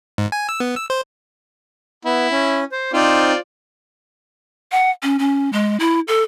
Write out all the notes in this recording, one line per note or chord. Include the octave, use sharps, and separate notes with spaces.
G#2
G#5
E6
B3
E6
C5
B3 E4
C#4
C5
C4 D#4 F4 C5 D5
F#5
C#4
C#4
G#3
E4
A4